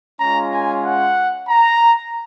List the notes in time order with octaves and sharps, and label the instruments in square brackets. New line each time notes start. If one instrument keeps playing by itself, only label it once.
[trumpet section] G#3 C#4 F4 A#5
G#5
F#5
A#5